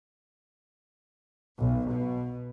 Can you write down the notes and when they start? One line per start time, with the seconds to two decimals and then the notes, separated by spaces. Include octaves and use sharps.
1.58 B1
1.89 B2